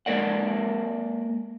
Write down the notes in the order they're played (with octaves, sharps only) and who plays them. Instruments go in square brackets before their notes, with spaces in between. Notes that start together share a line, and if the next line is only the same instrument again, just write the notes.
[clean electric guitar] G#3 A#3 A#4 D5 F#5